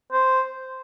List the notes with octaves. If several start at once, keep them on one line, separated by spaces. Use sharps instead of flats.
C5